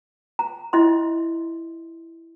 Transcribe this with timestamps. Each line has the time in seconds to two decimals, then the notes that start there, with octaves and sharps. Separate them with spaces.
0.39 A#5
0.73 E4 D#5 E5 C6